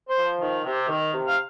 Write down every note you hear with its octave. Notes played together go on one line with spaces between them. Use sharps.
C5
F3
D#3
C3
D#3
C3
F5